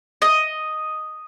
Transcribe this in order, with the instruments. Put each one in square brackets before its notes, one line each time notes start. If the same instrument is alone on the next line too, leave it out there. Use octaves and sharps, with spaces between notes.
[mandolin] D#5